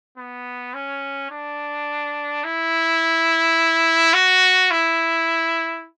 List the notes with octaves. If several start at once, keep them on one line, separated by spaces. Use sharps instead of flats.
B3
C#4
D4
E4
F#4
E4